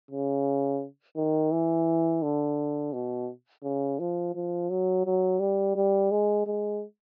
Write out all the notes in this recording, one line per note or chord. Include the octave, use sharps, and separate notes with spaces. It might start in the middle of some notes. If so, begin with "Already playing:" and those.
C#3
D#3
E3
D3
B2
C#3
F3
F3
F#3
F#3
G3
G3
G#3
G#3